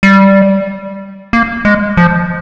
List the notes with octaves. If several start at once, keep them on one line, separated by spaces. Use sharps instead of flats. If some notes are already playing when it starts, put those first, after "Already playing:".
G3
A#3
G#3
F3